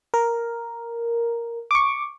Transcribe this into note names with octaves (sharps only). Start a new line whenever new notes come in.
A#4
C#6 D6